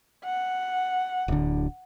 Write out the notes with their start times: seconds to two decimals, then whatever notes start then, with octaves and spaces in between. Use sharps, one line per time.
0.24 F#5
1.28 D1 D3